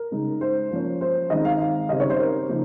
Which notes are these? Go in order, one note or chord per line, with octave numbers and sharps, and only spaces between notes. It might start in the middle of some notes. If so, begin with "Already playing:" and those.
Already playing: A#4
C#3 G#3 D#4
C5
F3 A#3 C#4
C5
D#3 G#3 C4 D#4 D#5
F5
F5
C#3 G3 C4 D#4 D#5
C#5
C5
A#4
C#3 F3 A#3 D#4